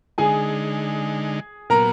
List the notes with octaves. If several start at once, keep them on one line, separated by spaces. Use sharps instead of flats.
D3 G#3 D#4 G#4 G#5
A#2 F#3 B3 A#4 A#5